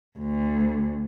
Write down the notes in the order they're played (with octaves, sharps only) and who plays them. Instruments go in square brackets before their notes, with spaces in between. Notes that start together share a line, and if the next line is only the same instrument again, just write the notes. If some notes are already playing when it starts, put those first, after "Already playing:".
[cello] D2